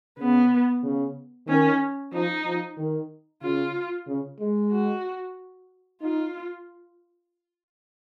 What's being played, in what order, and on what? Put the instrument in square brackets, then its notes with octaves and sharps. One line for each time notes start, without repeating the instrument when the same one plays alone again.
[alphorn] C#3 [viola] B3
[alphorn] C#3
[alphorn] D#3 [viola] C#4
[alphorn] F3 [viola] D#4
[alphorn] F3
D#3
[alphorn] C#3 [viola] F4
[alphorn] C#3
G#3
[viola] F#4
[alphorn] D#4 [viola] F4